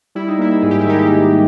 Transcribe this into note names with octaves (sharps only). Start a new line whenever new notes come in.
G3 E4
D#4
A#3 E4
G#2 G#4
G4
E4
D#3 D#4 G4